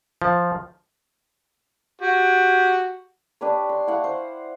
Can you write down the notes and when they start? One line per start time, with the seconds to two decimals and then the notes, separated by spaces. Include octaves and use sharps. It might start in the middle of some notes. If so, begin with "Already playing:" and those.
0.22 F3
2.01 F#4 G4
3.41 D4 G4 B4 C#5
3.69 C6
3.87 E4 F5 F#5 C#6
4.04 C5